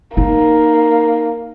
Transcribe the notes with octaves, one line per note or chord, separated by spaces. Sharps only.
A#3 D#4